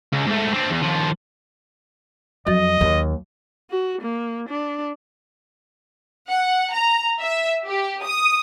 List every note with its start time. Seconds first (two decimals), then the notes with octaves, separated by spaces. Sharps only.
0.13 C#2
0.27 G#2 A3
0.54 C4 D4
0.71 E2
0.82 D#2 F3
2.47 F2 F#3 F#4 D#5 A6
2.81 D#2
3.70 F#4
4.01 A#3
4.49 D4
6.29 F#5
6.72 A#5
7.20 E5
7.66 G4
8.03 D#6